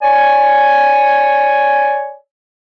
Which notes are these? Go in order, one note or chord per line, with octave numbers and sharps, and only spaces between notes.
C#5 D5 G#5